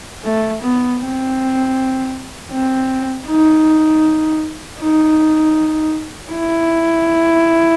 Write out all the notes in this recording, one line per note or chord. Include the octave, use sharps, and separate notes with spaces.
A3
B3
C4
C4
D#4
D#4
E4